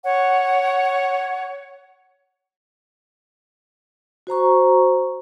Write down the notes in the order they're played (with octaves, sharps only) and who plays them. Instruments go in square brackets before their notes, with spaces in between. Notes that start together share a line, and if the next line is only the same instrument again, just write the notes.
[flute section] C#5 F#5
[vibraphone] F#4 C5 A#5 C#6